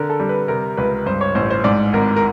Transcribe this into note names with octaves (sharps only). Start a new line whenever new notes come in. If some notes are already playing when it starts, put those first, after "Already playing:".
Already playing: D3 A#4
A4
G3
B4
C3 A#4
C#2 B4
G2 C5
C#5
A1 C5
C5
G#2 D5
G#1 A#4
A#4